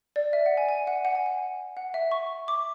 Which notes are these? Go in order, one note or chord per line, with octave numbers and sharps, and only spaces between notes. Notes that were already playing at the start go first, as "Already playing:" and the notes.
D5
E5
F#5
G#5
G#5
F#5
F#5
G#5
F#5
F#5
E5
C#6
D6